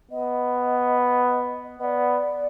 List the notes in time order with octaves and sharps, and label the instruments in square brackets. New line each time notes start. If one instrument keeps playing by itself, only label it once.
[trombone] B3 [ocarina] D#5
[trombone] B3 [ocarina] D#5
[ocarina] D5